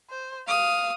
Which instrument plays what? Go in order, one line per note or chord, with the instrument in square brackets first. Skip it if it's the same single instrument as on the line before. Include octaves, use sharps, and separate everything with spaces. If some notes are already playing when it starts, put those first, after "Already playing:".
[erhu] C5
[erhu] F5 [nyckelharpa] D#6